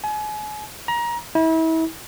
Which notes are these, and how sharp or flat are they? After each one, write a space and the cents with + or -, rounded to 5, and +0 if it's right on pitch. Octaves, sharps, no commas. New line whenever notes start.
G#5 +35
A#5 +25
E4 -35